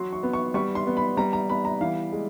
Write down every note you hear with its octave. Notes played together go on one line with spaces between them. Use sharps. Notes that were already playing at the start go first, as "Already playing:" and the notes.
Already playing: F#3 C6
C#6
B3
C#6
G3 C#6
C6
B3
B5
G3 A#5
A#5
B3 B5
A#5
E3 F5
G#3